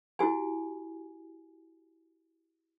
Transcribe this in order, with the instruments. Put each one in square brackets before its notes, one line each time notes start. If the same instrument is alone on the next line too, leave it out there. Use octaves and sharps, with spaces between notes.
[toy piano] E4 F#4 G4 G#5